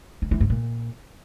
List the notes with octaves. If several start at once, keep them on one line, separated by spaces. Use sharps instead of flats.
D#3
E3
G#2
A#2